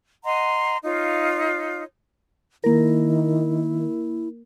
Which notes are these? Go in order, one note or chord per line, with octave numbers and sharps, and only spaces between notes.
D#5 F#5 A#5 C6
D#4 F4 C#5 F5
D#3 A#3 E4 A#4